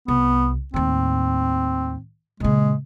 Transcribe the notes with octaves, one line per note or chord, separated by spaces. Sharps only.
C2 B3
D#2 A2 C4
A#2 C#3 G#3